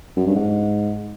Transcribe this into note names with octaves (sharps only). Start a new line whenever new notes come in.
F#2
G2
G#2